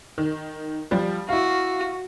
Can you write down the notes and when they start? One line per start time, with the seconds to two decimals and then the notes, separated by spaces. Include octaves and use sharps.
0.18 D#3
0.91 F3 G3
1.29 E4 F#4 F5